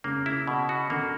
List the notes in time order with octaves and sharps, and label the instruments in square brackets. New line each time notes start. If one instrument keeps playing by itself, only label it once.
[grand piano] C#3 [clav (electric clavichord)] A#3
[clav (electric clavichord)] E4
B2
F#4
[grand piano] D3 [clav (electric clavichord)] A#3